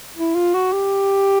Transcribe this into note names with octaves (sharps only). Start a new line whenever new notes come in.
E4
F4
F#4
G4